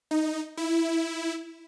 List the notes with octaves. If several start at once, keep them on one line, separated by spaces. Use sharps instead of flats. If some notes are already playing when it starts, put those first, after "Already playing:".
D#4
E4